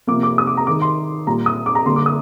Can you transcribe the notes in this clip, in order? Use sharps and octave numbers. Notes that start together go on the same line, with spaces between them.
C3 F3 A#3 D6
D6
D#6
D6
A#5
D#3 G#3 D6
C6
A#2 G3 A#3 A#5
D#6
D6
A#5
D3 G3 A#3 C6
D6
D#6